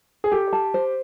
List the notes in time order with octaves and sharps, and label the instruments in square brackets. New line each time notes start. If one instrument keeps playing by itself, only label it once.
[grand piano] G#4
[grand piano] G4 [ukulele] A4
[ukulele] A5
C5